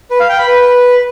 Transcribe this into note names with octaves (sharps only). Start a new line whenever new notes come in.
B4
F5
G5
B5
B4